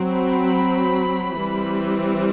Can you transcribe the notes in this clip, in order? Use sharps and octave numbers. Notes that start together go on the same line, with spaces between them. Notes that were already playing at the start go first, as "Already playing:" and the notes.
Already playing: F#3 C4
B5
E3 G3 C4